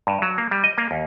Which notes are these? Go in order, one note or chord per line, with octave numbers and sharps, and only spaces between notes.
G2
F#3
A#3
G3
D#5
A#3
D#2